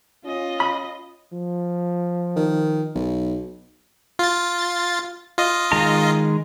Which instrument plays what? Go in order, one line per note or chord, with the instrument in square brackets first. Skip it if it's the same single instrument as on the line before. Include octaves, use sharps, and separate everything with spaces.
[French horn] C#4 [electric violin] F4 D#5
[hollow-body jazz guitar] B5
[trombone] F3
[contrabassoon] D#3
B1
[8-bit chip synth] F4 A6
F4 D#5
[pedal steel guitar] D#3 G#3 A#5